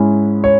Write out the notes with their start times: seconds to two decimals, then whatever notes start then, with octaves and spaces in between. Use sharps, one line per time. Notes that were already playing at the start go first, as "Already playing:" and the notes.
Already playing: G#2 G#3 C#4 E4
0.44 C#5